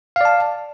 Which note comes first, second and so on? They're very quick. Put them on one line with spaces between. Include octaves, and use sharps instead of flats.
F5 D5 A5